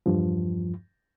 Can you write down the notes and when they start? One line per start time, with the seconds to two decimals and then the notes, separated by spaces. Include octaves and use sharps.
0.06 E2 G2 F3